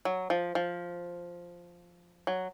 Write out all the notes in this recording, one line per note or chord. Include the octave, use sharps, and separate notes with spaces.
F#3
F3
F3
F#3